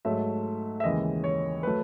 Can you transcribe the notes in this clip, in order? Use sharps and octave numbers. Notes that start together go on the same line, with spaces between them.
G#2 F#3 A3 E5
E5
D#2 C#3 E3 G#3 D#5
C#5
F#3 A3 B4